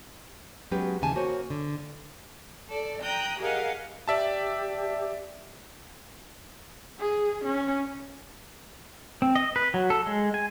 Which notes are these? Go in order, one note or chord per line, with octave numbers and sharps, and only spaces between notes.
F#3 G#3 B3 C#4 G4 B4
D#2 C#3 E3 G#5 A5
A#3 F#4 C5 C#5
D3
A4 D5
G5 A#5 D#6 F#6 G6
G4 G#4 A#4 D#5 F5 F#5
G4 D5 E5 A5
G#4
C#4
C4
D#5
B4
F#3
A4
G#3
G#5